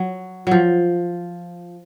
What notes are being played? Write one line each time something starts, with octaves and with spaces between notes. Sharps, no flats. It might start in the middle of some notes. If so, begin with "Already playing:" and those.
Already playing: F#3
F3 F#3